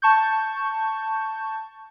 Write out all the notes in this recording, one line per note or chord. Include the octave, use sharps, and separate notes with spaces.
A5 C#6 G6